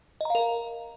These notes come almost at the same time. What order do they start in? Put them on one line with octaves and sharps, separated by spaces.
D#5 A#5 F5 A#4